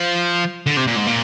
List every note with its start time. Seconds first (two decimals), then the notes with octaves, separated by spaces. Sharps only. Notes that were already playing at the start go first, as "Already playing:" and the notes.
Already playing: F3
0.66 D3
0.77 C3
0.87 A#2
0.97 G#2
1.07 A#2